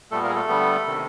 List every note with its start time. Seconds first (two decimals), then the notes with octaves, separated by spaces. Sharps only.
0.11 A#2 G3 A3 B3 A4
0.23 A#3 A#4
0.29 G#4
0.35 A3 A4
0.48 D3 G3 B3
0.86 C3 D#3